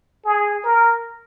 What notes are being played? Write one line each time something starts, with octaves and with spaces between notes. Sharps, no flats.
G#4
A#4